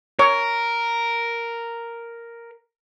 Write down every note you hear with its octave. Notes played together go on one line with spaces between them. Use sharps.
A#4 C#5